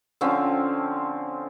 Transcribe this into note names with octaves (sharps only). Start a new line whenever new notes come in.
D3 F3 C4 C#4